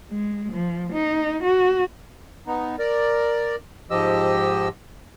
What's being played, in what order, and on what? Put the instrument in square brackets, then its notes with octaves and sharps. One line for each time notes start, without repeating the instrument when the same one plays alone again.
[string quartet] G#3
F3
D#4
F#4
[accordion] B3 D#4
A#4 D5
G#2 F3 G4 D#5 E6